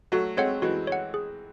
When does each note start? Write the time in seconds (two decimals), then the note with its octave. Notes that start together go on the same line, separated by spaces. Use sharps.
0.12 F#3 A3 F#4
0.37 G#3 C4 C#5 F#5
0.62 E3 G#3 F#4
0.87 C#5 F#5
1.14 G#4